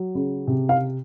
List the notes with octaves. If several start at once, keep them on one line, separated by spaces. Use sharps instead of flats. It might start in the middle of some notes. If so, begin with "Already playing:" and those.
Already playing: F#3
C#3
C3
F5